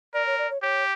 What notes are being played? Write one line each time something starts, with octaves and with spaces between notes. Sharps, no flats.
A#4 D5
C#5
D5
C#5
G4 C#5